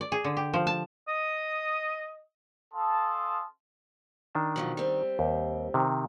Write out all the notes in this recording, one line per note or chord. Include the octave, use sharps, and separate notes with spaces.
D5
G#4
D3
G4
F3
A5
D#5 D#6
C#4 A4 F5 A5 C6 D#6
D#3 D4 A5
B2 F3 F#3
G3 C4
D#2
C3 D#3